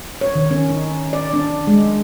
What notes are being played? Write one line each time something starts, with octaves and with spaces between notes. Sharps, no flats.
C#5
D#3
C#4
D#4
D5
D4
G#3